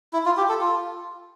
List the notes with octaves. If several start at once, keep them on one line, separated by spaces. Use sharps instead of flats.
E4
F4
G4
A4
F4